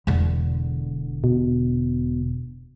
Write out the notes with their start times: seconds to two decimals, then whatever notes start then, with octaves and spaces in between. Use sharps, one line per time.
0.07 E1 D3
1.24 B2